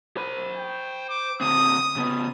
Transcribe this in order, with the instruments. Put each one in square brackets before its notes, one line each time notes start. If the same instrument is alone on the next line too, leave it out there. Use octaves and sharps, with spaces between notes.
[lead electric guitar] C5 B5
[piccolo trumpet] G5
D6
[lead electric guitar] D3 C4 [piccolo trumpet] D#6
[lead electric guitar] C#3 B3